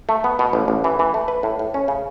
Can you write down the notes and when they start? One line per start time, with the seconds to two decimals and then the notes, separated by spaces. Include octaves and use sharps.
0.09 A3
0.24 B3
0.39 B2
0.53 A1
0.68 A1
0.84 E3
0.99 E3
1.14 A3
1.28 B4
1.43 A2
1.59 A2
1.74 C#4
1.88 C#3